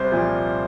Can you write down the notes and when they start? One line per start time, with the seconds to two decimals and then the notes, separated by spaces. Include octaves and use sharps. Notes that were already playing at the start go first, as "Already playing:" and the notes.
Already playing: C2 C5
0.12 A#2 F3